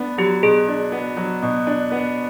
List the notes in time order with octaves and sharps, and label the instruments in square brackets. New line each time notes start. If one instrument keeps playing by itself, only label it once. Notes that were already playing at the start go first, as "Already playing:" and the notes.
Already playing: [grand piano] B3 D4
[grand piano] F#3 [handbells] G4
[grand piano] B2 [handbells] G#4
[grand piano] D4
B3
F#3
B2
D4
B3